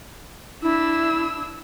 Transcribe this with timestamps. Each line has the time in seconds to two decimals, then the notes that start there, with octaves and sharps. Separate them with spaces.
0.62 D4 E4 E6